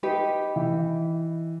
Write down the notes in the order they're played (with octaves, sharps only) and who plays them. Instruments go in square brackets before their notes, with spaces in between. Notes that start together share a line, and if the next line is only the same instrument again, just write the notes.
[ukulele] D#4 G4 B4
[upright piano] E3